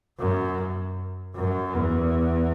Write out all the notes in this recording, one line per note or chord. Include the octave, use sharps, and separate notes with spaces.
F#2
F#2
E2